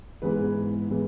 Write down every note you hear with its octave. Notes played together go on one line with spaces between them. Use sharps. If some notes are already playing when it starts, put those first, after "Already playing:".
G#2 E3 G#3 B3 B4
E3 G#3 B3